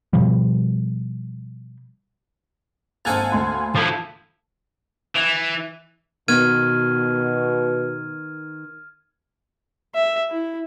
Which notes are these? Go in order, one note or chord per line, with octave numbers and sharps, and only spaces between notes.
B2 F3 G3
G#1 A#3 A4 C5 F5 F#5 G#5 A6
D2 C6
F3 E4 A4 F5
E3
B2 D#3 B3 F6 G#6 D#7
E5
E4